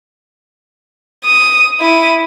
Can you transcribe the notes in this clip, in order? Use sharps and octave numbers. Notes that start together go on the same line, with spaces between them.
D#6
E4 D#7